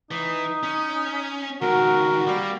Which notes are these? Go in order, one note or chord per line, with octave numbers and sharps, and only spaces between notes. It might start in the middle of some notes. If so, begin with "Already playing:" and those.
E3 D#4
C#4
C#2 D#3 F#4 A#4
G3 A#3